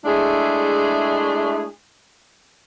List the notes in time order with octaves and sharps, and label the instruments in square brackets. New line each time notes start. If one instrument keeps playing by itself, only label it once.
[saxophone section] G#3 A3 D4 E4 G#4